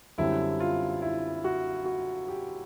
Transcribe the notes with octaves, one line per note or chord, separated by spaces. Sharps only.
F#2 D3 G3 C4 E4
F4
E4
F#4
F#4
G4